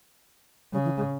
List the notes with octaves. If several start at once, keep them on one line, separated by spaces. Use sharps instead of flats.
C#3 G3
E3
G#3